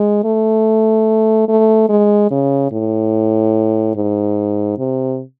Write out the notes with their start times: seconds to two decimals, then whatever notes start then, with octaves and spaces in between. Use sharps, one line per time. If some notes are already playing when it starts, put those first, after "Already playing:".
Already playing: G#3
0.24 A3
1.48 A3
1.89 G#3
2.31 C#3
2.72 A2
3.96 G#2
4.78 C3